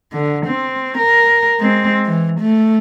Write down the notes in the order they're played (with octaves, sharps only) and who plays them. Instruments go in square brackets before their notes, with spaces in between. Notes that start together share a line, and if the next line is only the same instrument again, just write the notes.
[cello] D3
C4
A#4
G#3 C4
E3
A3